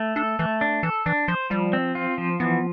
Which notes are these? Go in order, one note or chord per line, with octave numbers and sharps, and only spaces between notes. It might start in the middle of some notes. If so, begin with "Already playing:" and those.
Already playing: A3
D4 A4
E3 A3
D4
E3 A4
E3 D4
F3 C5
F3 G3
C4
F4
F3
E3 B3